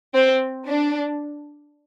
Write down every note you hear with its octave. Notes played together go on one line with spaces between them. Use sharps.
C4
D4